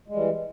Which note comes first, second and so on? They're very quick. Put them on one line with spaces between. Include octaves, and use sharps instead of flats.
G#3 G3 E3